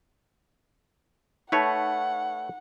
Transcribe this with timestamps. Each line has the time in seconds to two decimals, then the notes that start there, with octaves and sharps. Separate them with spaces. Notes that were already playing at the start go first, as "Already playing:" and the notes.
1.52 A3 D#4 B4 C#5 F#5